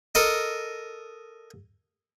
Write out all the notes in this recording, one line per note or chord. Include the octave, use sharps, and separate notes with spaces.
A4 A#4 D#5